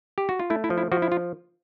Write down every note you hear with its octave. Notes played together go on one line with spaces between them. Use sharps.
G4
F#4
F4
A3 E4
E4
F3
E4
F3 F#4
E4
F4